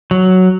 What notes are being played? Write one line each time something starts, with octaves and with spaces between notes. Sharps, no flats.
F#3